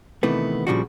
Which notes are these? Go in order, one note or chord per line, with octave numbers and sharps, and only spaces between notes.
C3 D#3 E3 A3 B3
A#2 C#3 F3 G3 D4 F#4